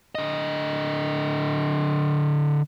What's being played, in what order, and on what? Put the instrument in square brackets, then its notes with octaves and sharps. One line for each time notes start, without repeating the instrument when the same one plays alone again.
[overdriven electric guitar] D3 D#5